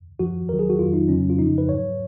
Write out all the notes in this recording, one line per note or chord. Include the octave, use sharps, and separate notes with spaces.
F#2 F3 F#4
D#2 D#3 F#3 A#4
G#4
F#4
F2 D#3 F#3 F4
D#4
F2 C#3 F#3 C#4
F4
F2 C#3 F3 D#4
B4
G#2 F#3 C#5